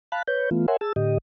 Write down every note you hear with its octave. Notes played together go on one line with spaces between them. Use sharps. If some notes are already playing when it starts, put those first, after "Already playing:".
F5 A5 B5 F#6
B4 C#5 G6
E3 A3 B3 F4
A#4 C#5 E5 F#5 G#5 C6
G#4 A5 E6
A2 D3 G4 D#5